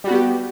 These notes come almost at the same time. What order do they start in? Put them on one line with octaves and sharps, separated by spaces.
G3 F#4 B3 G4